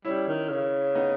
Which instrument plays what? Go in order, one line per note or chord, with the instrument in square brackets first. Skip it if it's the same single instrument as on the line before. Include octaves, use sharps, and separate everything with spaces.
[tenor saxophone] G3 [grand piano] C#4 E4
[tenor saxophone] D#3
C#3
[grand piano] B3 D#4